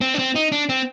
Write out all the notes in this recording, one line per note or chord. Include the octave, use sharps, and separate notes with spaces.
C4
D4
C4
D#4
D4
C4